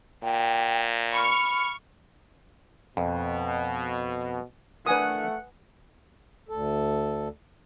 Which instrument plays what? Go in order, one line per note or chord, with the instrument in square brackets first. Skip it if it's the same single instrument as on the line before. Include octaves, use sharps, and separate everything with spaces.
[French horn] A#2 [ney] G5
[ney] B5 [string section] C#6 F6
[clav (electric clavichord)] F2 [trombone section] B2
[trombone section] A3 [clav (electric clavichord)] D4 A#4 [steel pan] B4 G#5 D#6 [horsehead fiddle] F#5
[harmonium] D2 A4